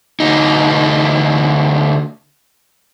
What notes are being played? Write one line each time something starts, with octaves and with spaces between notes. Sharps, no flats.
D2 D#4